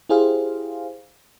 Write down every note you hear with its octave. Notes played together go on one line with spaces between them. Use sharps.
E4 G4 G#4 C5 F5